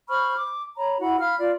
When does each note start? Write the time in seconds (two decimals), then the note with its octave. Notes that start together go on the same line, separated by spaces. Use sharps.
0.09 C5 B5 C#6 F6
0.38 D6
0.77 C#5 A#5 B5
1.00 E4 F#4 F#5 B5
1.19 F5 B5 F6
1.38 F4 D5